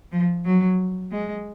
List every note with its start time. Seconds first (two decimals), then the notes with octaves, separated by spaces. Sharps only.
0.12 F3
0.45 F#3
1.11 G#3